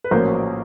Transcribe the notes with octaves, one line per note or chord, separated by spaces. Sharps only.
B4
A#1 A2 F#3 A#3 C#4 A#4 C5